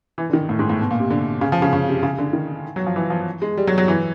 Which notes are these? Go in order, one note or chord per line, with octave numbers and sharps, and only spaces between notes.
E3
D3
D#3
A2
G#2
A2
B2
A#2
C3
D3
C#3
F3
C#3
C#3
C3
C#3
D3
D#3
F#3
F3
E3
F3
G#3
G3
F#3
F#3
E3